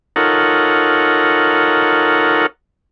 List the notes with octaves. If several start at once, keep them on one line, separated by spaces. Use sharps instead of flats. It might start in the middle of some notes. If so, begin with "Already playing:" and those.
D#4 F4 A4 A#4 C#5 F#5